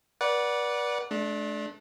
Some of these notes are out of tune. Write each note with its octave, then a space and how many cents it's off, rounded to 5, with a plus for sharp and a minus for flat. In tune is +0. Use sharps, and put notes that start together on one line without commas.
B4 -35 D5 -10 F#5 +0
A3 -40 D4 +0